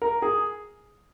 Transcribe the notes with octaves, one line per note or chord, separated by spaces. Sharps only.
A#4
G#4